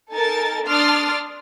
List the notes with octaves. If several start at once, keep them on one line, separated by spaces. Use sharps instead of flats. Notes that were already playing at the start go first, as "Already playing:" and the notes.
D#4 A4 A#4 G#5 A5 A6
D4 C6 D#6 F6 A6 D7